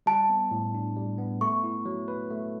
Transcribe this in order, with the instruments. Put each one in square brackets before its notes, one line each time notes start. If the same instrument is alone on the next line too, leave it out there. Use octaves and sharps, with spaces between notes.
[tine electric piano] G3 [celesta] A5
[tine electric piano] B3
A2
D4
G3
B3
[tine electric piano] A3 [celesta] C#6
[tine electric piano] E4
F#3
B4
A3